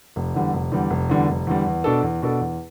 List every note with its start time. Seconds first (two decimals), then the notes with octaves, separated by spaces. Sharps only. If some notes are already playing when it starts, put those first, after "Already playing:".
0.16 F1
0.34 E2 D3 G3
0.54 F1
0.72 E2 D3 G3
0.90 F1
1.09 E2 D3 G3
1.29 F1
1.47 E2 D3 G3
1.66 E2
1.84 B2 B3 D4 A4
2.03 E2
2.22 B2 B3 D4 A4
2.41 E2